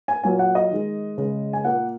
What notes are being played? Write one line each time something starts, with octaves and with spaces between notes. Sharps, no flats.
G#5
A#2 F#3 A#3 G#5
F#5
D#5
D#3 G#3
C#3 G#3
G#5
A#2 A#3 F#5